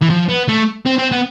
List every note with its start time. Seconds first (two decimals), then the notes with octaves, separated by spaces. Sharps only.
0.02 E3
0.10 F3
0.29 B3
0.49 A3
0.86 C4
0.99 C4
1.12 B3